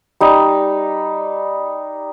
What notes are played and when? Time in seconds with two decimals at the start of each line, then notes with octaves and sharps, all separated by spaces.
0.21 G3 D#4